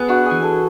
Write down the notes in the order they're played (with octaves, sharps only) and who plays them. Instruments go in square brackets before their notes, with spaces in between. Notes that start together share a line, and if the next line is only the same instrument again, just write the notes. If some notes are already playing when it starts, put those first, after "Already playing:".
Already playing: [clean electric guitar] B3 [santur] G#4 B4
[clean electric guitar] D4 [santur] F#4
[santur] G#4
[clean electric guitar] E3
[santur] A4